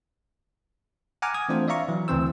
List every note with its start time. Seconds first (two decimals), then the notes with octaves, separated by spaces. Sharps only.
1.22 F#5 G#5 A#5 D6 F6
1.34 D#6 G#6
1.49 E3 A3 C4 D4 F4 C5
1.68 D5 E5 F5 A#5 C#6
1.89 E3 F#3
2.08 D2 C#3 E3 C4 C5 E6